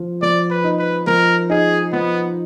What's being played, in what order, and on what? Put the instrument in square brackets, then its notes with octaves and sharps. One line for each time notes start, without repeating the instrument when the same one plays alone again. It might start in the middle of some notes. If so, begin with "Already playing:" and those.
Already playing: [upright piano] F3
[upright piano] F3 [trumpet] D5
[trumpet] B4
[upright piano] D#4
[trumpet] B4
[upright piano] F3 [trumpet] A#4
[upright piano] D#4 [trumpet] G#4
[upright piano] F3 [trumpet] B3